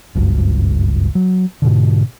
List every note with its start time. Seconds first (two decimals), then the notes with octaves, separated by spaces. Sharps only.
0.15 F#1 C#2 G2
1.15 F#3
1.62 G#2 B2 D3